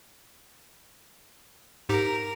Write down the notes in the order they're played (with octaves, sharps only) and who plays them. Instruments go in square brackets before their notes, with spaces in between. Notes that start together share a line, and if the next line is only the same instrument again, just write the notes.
[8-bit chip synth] G#2 D#4 G4 [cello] A#4